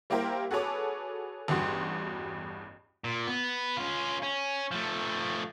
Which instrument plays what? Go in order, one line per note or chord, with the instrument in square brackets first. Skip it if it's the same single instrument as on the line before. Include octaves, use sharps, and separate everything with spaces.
[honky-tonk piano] G3 A#3 E4 G4 A#4 C5
F#4 G#4 A4 B4 C#5 D6
A1 E2 G2 F#4 C6
[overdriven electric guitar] A#2
B3
C#4 F4
C#4
F3 A3